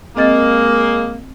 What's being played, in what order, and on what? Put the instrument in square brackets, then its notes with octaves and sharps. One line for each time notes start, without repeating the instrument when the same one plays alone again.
[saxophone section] G#3 A#3 [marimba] C4 D#5 A6